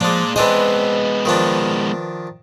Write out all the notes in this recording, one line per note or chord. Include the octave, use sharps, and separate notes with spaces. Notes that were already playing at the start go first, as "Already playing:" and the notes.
A#2 F3 G#3 D4 D5
G#3 B3 C4 D4 B4 C5 D#5
D#3 F3 D4